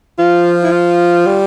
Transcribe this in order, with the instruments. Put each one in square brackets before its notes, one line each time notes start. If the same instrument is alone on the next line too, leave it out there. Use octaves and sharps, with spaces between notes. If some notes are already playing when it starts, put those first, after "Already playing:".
[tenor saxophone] F3 [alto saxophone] F4
[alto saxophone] E4
F4
[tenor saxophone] G3